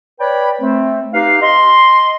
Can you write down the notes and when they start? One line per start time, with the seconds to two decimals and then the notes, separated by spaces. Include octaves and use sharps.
0.20 B4 C#5 D5 G5 B5
0.60 A3 C4
1.14 D#4 G4 B4 F5
1.41 D#5 C6